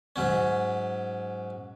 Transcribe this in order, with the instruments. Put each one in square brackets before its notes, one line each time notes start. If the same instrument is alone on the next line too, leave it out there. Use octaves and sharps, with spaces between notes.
[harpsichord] G#2 F#3 C#4